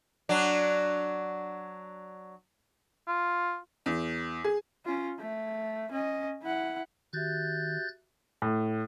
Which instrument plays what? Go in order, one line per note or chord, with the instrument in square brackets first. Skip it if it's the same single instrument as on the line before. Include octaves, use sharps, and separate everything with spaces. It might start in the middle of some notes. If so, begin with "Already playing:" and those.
[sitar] F#3 D4
[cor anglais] F4
[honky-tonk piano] E2
G#4
[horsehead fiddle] C#4 F4
A3
C#4 D#5
E4 F#5
[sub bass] D#3 [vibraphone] F#4 G4 E5 [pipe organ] F#6 G6 A6
[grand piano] A2